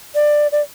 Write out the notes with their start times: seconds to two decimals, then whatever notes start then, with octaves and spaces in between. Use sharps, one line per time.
0.15 D5
0.52 D5